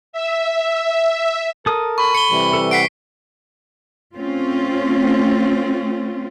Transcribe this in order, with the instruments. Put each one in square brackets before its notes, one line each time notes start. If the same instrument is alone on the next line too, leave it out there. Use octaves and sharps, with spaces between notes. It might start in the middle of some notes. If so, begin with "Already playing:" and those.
[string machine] E5
[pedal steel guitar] A4 D#6 [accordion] A#4
[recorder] B5 [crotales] C#6
[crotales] C#7 G7
[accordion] C3 E3 G3
[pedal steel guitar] A4 B4
[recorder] F#5 [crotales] B6 C7 D7
[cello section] A3 C4 C#4 F4